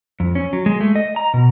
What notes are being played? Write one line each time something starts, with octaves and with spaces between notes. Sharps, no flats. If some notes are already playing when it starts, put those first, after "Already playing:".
F2
C#4
F#3
G#3
A3
D#5
A#5
B2